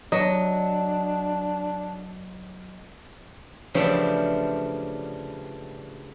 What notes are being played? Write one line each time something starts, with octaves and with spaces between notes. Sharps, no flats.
F#3 D4 D#5
C#3 E3 F3 G3 A3 D4